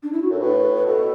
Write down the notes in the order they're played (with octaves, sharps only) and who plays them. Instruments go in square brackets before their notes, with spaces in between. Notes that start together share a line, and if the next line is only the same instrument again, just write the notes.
[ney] D4
E4
F#4
[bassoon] F#2 [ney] A4
[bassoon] A2 [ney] B4
[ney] B4
[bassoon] B2 [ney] A4